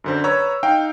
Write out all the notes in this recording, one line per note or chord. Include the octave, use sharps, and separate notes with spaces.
F#2 D3 C5
B4 C#5 A#5 E6
D#4 F5 G5